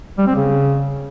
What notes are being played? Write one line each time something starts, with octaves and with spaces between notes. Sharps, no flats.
G3
C4
C#3